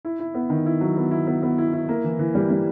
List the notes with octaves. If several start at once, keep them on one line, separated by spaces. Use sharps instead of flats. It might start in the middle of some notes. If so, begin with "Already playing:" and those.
E4
E4
B3
D#3
E4
F#3
B3
E4
B3
B3
E4
E4
A#3
E3
E3
G3
G3